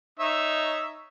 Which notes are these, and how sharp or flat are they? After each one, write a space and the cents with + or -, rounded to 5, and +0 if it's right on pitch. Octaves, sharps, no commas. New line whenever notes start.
D#4 +0 C#5 +0 E5 +0